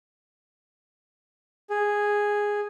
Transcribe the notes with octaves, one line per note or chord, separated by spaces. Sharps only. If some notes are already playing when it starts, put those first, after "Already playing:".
G#4